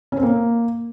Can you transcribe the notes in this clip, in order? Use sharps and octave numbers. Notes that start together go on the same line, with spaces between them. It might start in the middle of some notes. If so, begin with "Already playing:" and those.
C#4
C4
A#3